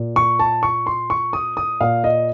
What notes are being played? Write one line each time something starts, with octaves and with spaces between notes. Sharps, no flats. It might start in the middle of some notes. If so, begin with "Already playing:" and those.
Already playing: A#2
C#6
A5
C#6
C6
C#6
D#6
D#6
A#2 F5
D#5